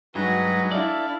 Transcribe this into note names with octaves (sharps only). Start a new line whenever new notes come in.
G2 F#3 G#3 D#4 F#4 B4 A#5
D4 E4 A4 D5 F5